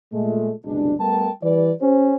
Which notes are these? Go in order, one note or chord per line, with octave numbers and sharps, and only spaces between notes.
A#2 G#3 A3
F#1 C2 B2 G#3 D4
G3 A3 B3 A#4 G5 A5
E3 G3 B4 D5
C#4 G4 C5